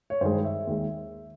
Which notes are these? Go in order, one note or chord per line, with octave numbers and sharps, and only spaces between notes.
C#5
G2 D#3 G#3 C5
E5
D#2 D#3 G#3